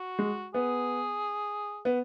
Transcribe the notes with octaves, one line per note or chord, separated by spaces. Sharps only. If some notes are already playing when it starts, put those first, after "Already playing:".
Already playing: F#4
G#3
B3 G#4
B3